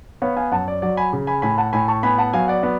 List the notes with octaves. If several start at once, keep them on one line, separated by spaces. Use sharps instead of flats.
B3 C#5 F5
F5 G#5
F#2 F#5 A5
D5
F#3 D5
G#5 B5
C#3
G#5 B5
A2 G#5 B5
F#5 A5
A2 G#5 B5
A5 C#6
B3 G#5 B5
F#5 A5
F#3 F5 G#5
D5 F#5
B3